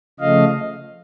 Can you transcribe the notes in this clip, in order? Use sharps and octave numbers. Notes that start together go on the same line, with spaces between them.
C#3 F3 A3 D#5 F5